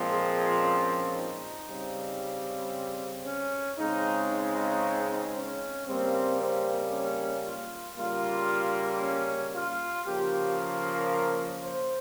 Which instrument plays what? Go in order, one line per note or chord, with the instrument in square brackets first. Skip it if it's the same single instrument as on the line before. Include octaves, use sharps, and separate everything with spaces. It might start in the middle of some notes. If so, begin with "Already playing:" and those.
Already playing: [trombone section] A#2 F3 G#3 C4
G#4
C#4
D#4
C#3 G3 C4
C#4
C#3 G#3 C4 D#4
D#4
C#4
C#3 G3 A#3 C4
C4
C#4
F4
C#3 G3 A#3 F4
C#4
F4
C#3 F3 A#3 G4
A#4
C5